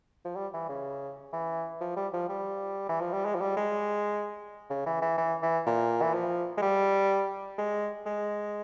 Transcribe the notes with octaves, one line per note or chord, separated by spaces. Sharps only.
F3
G3
E3
C#3
E3
F3
G3
F3
G3
E3
F3
G3
G#3
F3
G3
G#3
C#3
E3
E3
E3
E3
A#2
E3
F3
G#3
G3
G#3
G#3